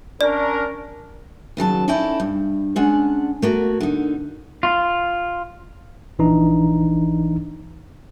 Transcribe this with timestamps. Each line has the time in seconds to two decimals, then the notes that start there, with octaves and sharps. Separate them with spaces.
0.21 C#4 D4 A#4 D5
1.57 D#2 C#3 F#3 A5
1.88 C#4 D#4 E4 A4 D5 G5
2.20 G2
2.76 G#3 C#4 D4 F#5
3.42 A3 A#3 F#4
3.81 D3 D#4
4.63 F4
6.19 A#1 E3 D4 D#4 A#5